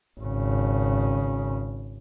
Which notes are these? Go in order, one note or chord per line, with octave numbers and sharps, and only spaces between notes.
G#1 C#3